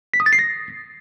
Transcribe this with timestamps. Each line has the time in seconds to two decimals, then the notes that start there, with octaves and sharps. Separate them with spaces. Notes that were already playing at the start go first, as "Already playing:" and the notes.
0.14 B6
0.20 D#6
0.26 A6
0.33 C7
0.39 A#6